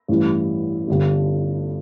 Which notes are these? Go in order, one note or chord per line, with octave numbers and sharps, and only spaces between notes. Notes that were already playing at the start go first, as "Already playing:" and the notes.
A1 G2 E3
G1 G2 D3